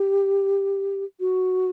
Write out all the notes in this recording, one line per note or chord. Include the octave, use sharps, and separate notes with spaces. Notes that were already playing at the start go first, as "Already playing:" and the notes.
Already playing: G4
F#4